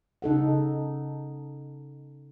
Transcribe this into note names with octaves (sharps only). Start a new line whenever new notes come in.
C#3 D#4 A4 F#5